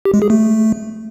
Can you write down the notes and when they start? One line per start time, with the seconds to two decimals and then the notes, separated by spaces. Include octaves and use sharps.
0.05 G4
0.14 G#3
0.22 G#4
0.30 A3